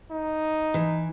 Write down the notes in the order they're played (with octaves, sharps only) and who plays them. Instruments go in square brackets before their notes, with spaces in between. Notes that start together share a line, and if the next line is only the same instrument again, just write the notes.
[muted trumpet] D#4
[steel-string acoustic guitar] E3